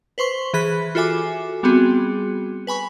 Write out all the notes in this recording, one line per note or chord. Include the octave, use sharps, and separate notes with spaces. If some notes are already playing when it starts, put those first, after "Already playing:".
B4 C5 C6 C#6
E3 G#4 B5 F#6 B6
F4 F#4 A4 E5 G#5 D6
G3 B3 C4 F#4 G#4
B4 G#5 B5 C#6